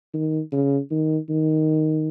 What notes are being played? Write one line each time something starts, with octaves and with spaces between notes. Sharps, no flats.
D#3
C#3
D#3
D#3